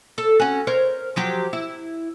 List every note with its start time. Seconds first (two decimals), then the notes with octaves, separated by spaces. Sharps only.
0.18 A4
0.40 C#4 F#4
0.67 A#4 C5 C#5
1.16 F3 F#3 G4
1.53 E4